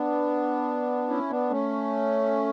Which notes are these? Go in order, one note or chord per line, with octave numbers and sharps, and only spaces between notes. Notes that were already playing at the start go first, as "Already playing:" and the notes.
Already playing: B3 D4
C#4 E4
B3 D4
A3 C#4